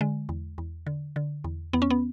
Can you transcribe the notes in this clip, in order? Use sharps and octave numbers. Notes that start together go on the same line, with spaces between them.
D3 G#3
E2
E2
D3
D3
E2
E2 B3
C#4
B3